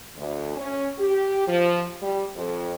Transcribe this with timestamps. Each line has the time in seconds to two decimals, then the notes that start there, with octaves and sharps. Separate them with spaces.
0.17 D2
0.56 C#4
0.99 G4
1.46 F3
2.03 G3
2.35 F2